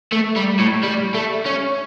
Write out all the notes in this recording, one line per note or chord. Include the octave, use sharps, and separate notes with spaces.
A3
G3
A2
G3
A3
C#4